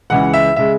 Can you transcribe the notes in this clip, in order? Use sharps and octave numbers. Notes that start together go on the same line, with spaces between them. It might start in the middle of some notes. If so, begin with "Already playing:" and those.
C#2 C#3 E3 G#3 F#5
E5
C#3 G#3 E5